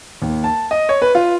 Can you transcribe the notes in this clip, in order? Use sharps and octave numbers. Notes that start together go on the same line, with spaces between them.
D#2
A5
D#5
C#5
B4
F4